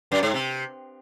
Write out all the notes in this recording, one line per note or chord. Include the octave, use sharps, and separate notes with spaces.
F#2
G#2
C3